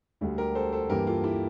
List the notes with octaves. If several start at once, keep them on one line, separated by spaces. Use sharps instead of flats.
D2 D3 G3
G4 A#4
A4 C5
A4 C5
G2 E3 A#3 G4 A#4
F4 A4
E4 G4